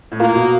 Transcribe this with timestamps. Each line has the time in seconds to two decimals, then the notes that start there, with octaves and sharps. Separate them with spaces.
0.12 A2
0.20 A#2 A#3
0.35 B2